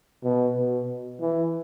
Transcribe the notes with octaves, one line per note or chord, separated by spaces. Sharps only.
B2
B2
E3